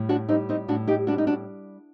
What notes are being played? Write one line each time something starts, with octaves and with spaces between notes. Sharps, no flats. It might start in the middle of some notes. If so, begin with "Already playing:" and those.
Already playing: A2 G3
D4 F#4
G3 C4 D#4
C4 D#4
A2 D4 F#4
D#4 G4
G3 D4 F#4
D#4
D4 F#4